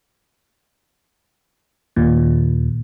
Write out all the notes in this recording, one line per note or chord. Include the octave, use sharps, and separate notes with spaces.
D#2 A#2